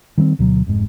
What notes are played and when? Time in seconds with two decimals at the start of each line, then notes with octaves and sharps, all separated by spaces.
0.18 D#3 G3 B3 C4
0.39 D2 B2 F#3
0.66 F1 G#2